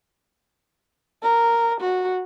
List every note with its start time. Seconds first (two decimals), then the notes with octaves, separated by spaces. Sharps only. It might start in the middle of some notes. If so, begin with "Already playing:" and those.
1.23 A#4
1.80 F#4